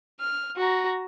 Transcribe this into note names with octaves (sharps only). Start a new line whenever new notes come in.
F6
F#4 A#5